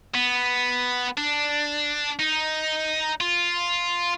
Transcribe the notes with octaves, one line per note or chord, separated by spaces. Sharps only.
B3
D4
D#4
F4